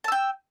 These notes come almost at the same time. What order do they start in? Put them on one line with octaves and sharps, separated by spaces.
A5 E6 G5